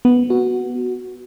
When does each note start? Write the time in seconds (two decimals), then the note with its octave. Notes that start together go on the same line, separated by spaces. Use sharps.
0.05 B3
0.30 F#4